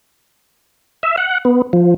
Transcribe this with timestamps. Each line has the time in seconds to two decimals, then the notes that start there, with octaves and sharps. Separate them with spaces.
1.03 E5
1.18 F#5
1.45 B3
1.73 F3